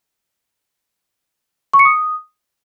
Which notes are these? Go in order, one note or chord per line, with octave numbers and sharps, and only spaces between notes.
C#6
C#7
D#6